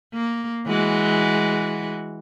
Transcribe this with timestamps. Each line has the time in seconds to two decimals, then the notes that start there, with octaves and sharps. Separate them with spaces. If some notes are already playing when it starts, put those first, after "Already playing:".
0.14 A#3
0.66 E3 G#3 F#4